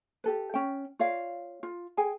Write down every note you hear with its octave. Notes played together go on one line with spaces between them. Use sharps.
G4 A4 B4
C#4 G5
F4 C#5 D5 F5
F4
G#4 G5 G#5